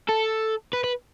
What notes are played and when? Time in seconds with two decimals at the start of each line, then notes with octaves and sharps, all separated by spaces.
0.09 A4
0.73 B4
0.84 B4